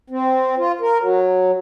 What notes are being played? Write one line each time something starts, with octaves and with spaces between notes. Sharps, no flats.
C4
F4
A#4
F#3